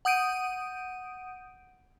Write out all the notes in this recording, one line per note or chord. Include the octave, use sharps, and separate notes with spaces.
F#5 D#6 G6 D7 D#7